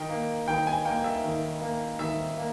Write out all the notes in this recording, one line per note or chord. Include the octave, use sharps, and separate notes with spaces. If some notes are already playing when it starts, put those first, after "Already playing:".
Already playing: D#3 G5
A#3
D#3 G5
G#5
A#3 G5
E5
D#3
A#3
D#3 E5
A#3